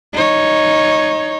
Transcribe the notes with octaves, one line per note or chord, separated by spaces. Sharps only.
D#4 C#5